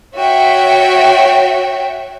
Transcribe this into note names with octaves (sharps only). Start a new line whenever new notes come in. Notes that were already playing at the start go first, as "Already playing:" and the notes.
F#4 C#5 E5 G5